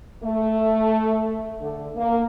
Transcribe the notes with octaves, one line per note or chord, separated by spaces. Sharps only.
A3
D3
A#3